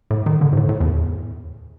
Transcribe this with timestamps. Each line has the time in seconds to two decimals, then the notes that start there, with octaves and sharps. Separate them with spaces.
0.11 A2
0.26 D#3
0.41 D3
0.53 G#2
0.57 A2
0.69 A2
0.80 E2